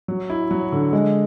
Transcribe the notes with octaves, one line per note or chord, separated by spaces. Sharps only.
F#3
E4
F#3
D3
G#3